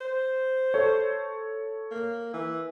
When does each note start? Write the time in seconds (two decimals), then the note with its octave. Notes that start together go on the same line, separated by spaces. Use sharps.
0.01 C5
0.74 A4 C#5
1.91 A#3
2.34 E3